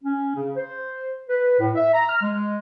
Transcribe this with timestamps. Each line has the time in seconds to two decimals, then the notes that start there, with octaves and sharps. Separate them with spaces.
0.03 C#4
0.35 C#3
0.56 C5
1.28 B4
1.59 A2
1.76 E5
1.93 A#5
2.09 F6
2.21 G#3